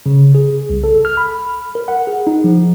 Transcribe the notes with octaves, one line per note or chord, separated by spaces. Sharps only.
C#3
G#4
C2
A4
F6
B5
A#4
F#5
G#4
D#4
F3